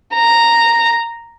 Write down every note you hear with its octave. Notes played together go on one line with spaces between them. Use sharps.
A#5